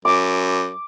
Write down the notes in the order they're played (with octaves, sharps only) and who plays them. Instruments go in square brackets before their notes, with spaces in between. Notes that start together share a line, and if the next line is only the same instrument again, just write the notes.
[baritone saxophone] F#2 [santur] D6